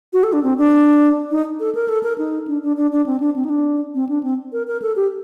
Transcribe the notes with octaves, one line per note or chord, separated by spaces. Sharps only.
F#4
A4
D4
C4
D4
D#4
A4
A#4
A4
A#4
D#4
D4
D4
D4
D4
C4
D4
C4
D#4
D4
C4
D4
C4
A#4
A#4
A4
G4